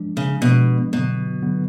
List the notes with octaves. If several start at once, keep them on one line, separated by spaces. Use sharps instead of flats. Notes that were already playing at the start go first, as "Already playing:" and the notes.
Already playing: F3 G#3 D4
C#3
B2 F3 G#3 D4
B2 D3 F#3 B3
D3 F#3 B3